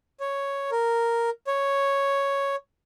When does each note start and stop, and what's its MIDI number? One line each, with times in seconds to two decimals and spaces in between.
0.20 0.70 73
0.71 1.30 70
1.47 2.56 73